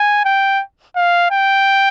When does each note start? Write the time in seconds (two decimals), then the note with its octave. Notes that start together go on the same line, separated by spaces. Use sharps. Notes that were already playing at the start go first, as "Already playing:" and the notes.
Already playing: G#5
0.25 G5
0.96 F5
1.31 G5